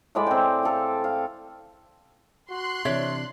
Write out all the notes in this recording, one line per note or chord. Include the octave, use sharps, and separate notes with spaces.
A2 G#3 D5 B5
C4 G5
A4 F5
F5
F#4 C6 F#6
C3 E3 D4 C#5 D5 E5